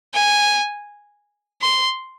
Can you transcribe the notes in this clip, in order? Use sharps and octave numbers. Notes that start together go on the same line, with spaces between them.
G#5
C6